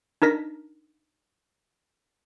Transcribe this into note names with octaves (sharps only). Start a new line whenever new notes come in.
D4 D#4 A#4 A#6 B6